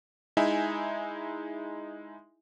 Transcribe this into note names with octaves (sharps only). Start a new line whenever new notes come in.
G#3 D#4 E4 E5 G#5